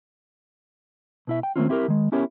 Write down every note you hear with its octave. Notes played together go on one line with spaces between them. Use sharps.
B2 E4 E5
G5
D#3 A3 A#3 C4 C#4 F4
C4 E4 G4 A4 A#4
D#3 G#3
B3 C#4 E4 G4 A#4 C#5